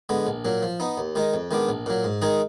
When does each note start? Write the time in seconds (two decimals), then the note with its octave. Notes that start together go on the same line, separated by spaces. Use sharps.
0.09 D3 G#3 B3
0.27 A#1
0.45 A#2 F#3
0.63 F3
0.80 B3 D#4
0.98 D#2
1.15 D#3 G#3 D#4
1.34 F2
1.51 D#3 G#3 B3 D4
1.69 A#1
1.86 A#2 F#3
2.04 G#2
2.22 D#3 G#3 D#4 G#4